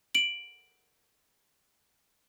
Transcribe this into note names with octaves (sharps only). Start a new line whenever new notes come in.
D7 F#7